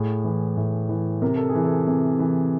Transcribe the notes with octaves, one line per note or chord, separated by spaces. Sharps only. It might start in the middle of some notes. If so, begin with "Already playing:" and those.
Already playing: A2 G#4
E3
A2
E3
C3 A#4
A4
G#4
E3
A4
C3
E3